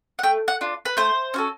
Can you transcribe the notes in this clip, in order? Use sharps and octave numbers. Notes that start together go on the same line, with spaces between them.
F#5
A3 G5
F#5
D4 F4
B4
A3 C5
C#4 F#4 A4